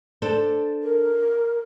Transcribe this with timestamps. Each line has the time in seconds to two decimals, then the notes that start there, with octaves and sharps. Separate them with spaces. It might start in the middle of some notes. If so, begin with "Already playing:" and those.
0.22 D4 A4 C5
0.83 A#4